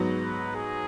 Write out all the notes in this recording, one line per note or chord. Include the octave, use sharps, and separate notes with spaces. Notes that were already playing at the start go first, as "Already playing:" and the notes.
Already playing: G#2 F#3 B3
B4
G#4